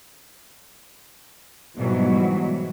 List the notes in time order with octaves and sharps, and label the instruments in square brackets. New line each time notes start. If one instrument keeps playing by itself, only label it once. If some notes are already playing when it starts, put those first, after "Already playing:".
[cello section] G#2 B2 E3 F#3 G3